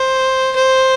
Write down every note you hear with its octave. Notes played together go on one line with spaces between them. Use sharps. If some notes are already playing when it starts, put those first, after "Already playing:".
Already playing: C5
C5